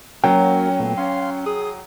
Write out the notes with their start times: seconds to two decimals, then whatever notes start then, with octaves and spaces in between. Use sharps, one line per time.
0.24 F#3 A#3 C#4 F#4 A#4 G5
0.79 A#2 A3 B3
0.97 C#4 F5 C6
1.46 G#4 D#6